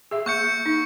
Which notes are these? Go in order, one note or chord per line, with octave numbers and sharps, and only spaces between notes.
G#4 E5
A#3 C#6 G6 C#7
D#4